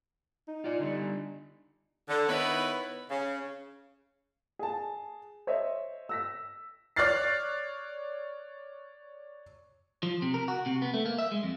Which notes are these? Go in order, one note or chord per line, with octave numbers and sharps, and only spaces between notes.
D#4
F4 D5
D3 G3
D3
D#3 B3 D#4 E4 B4 C#5
C#3
G#4 A5
C5 C#5 D#5 E5
E6 A#6 B6
C#5 D5 F6 F#6 A6 C7
F3
C3
A#4
F#4
C3
B3
A3
A#3
E5
G#3
F2